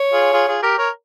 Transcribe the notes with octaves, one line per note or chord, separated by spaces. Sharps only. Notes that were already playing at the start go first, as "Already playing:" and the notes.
Already playing: C#5
F4 G#4
F4 G#4
F4 G#4
G4 A#4
A#4 C#5